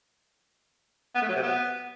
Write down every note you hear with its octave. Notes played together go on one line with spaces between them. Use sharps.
B3
A3
F#3
C3
B3